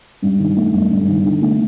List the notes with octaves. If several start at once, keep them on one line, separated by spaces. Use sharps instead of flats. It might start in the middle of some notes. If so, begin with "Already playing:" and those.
G2
D#3
A3
G1
G2
D#3
D3
A3